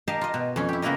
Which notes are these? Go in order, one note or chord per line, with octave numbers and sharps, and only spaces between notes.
G4 A#4 D#5 F5 A5
F4 D#5
B2
F2 C#4
E4 G4
C#3 A#3 B3 E4 A#4 D#5